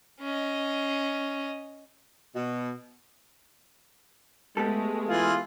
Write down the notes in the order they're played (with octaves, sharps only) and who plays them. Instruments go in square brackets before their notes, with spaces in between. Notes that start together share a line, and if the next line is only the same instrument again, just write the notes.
[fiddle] C#4 D#5
[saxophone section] B2
[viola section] G#3 A3 [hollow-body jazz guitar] B3 G4 A4
[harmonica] E3 G#4 [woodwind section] F4